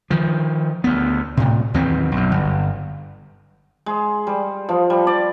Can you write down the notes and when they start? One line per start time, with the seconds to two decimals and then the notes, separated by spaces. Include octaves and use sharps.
0.10 D#3 F3
0.84 D2 B3
1.37 A2 C3
1.74 D#2 D#3 E3 C4
2.12 B1 F#2
2.32 G1
3.86 G#3
4.27 G3
4.69 F3
4.90 G3
5.07 D5